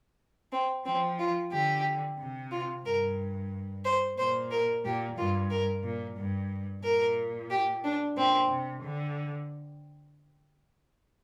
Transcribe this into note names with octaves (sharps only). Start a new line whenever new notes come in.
C4
F3 C4
F4
D3 G4
C3
F4
G2 A#4
C5
A#2 C5
A#4
A#2 G4
G2 F4
A#4
A#2
G2
A#2 A#4
G4
D4
A#2 C4
C3
D3